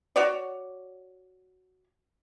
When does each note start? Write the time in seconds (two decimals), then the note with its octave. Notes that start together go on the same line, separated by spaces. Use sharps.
0.16 F#4 C#5 D5